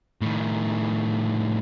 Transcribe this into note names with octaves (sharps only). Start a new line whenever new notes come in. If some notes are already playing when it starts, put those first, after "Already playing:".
A2 D#3